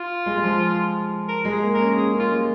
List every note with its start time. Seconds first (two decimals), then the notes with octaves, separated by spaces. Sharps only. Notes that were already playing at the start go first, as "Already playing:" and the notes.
Already playing: F4
0.26 G#3
0.37 G#3
0.44 F3
1.29 A#4
1.45 G#3
1.51 G#4
1.62 A#3
1.74 A#4
1.79 C#4
1.96 C#4 G#4
2.14 A#3
2.19 F4
2.30 G#3